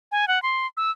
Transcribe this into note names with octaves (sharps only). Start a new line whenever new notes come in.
G#5
F#5
C6
E6